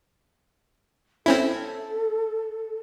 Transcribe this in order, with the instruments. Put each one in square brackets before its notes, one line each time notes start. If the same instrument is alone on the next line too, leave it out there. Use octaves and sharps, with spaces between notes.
[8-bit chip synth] C4 C#4 E4 [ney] A4